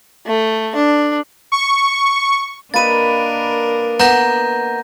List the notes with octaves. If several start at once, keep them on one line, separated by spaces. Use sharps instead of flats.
A3
D4
C#6
A#3 D4 A#4 B4 D#5 A6 D#7
B3 A#5 G6 A#6